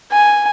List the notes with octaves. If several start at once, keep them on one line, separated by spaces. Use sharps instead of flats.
G#5